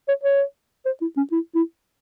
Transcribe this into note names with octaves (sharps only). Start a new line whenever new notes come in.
C#5
C#5
C5
E4
C#4
E4
E4